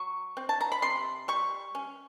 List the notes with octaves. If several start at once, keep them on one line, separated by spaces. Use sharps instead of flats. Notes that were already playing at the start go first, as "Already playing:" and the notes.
Already playing: F#3 C#6
C4
A5
A#5
B5
C3 C6
G3 C#6
C#4